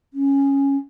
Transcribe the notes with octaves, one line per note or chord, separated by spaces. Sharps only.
C#4